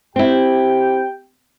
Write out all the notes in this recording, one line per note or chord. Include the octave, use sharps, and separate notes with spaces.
C4 E4 G4 G5